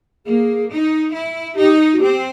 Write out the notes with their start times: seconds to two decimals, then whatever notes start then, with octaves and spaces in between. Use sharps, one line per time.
0.26 A#3 G#4
0.69 D#4
1.13 E4
1.55 D#4 G4
1.93 F#4
1.99 C4 G4